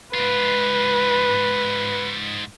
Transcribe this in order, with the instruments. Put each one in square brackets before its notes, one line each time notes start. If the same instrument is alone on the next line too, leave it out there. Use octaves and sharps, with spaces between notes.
[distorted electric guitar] G#2 F4 [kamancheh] B4